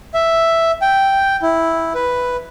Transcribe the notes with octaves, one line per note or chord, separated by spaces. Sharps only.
E5
G5
E4
B4